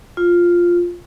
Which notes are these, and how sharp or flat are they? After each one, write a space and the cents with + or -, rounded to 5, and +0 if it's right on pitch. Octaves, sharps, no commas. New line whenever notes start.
F4 +0